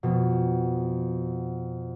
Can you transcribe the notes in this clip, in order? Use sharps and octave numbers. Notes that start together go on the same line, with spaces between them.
F2 B2